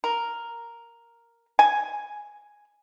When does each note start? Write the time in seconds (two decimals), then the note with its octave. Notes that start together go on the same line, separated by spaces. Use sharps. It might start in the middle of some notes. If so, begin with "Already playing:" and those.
0.04 A#4
1.59 G#5